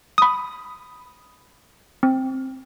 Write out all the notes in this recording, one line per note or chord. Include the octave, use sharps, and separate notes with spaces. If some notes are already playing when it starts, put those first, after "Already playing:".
B5 D#6
C4